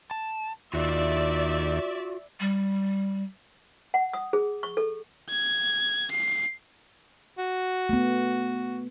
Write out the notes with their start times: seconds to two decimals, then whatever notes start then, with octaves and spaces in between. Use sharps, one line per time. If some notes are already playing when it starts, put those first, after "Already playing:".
0.11 A5
0.73 D#2 F4 F#4 D5 E5
2.40 G3
3.94 F#5
4.13 D#6
4.33 G#4
4.63 C#6
4.77 A4
5.30 G#6
6.12 C7
7.38 F#4
7.89 A3 B3